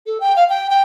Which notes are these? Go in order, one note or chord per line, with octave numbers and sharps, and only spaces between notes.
A4
G5
F5
G5
G5